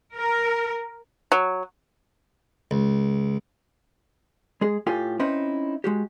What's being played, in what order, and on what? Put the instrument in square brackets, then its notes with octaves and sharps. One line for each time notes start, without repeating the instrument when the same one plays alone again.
[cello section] A#4
[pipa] F#3
[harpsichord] C#2
[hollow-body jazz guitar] G#3 G#4
A2 F4 G4 A4 G#5
C4 C#4 D#4 E4 B4
G#3 F#4 G4